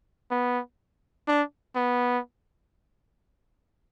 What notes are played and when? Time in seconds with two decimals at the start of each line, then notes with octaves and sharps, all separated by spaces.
0.31 B3
1.28 D4
1.76 B3